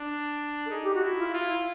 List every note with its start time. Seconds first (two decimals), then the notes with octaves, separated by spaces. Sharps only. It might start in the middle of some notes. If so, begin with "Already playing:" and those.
Already playing: D4
0.66 A4
0.70 D#4 G#4
0.83 G4
0.94 F#4
1.02 E4
1.18 F4
1.34 F4
1.41 E4